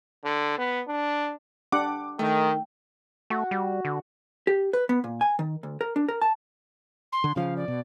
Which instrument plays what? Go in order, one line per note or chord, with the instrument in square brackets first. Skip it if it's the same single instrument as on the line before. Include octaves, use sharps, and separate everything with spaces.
[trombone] D3
B3
D4
[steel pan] D4 G4 F#5 [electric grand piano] D6
[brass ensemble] D#3 [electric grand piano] A3 [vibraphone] G5
[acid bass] A3 [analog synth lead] F#4
[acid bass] G3
D3
[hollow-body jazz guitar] G4
B4
B3
A#2
G#5
D#3
D2
A#4
D4
A#4
A5
[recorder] C6
[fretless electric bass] D3
[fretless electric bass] C#3 F3 [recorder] F5
[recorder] D5
[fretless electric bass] B2